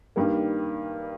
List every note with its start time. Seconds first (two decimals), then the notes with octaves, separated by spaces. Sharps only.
0.16 G2 D#3 G3 A#3